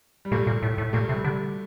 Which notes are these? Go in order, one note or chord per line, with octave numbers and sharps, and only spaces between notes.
G3
A#2 A3
A#2
A2
A2
A#2 A3
C3
G3
D3